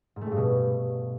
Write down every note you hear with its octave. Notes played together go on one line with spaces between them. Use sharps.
G#2
A3
A2
G2
B2